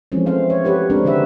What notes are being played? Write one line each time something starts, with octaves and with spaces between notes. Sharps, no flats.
E3 F3 G#3 A3 C4 C#4
A3 C4 C5 F5
C#5
F#4 G4 B4 C#5
G#3 A3 C4 D4 A#4
D3 D#3 F#4 B4 E5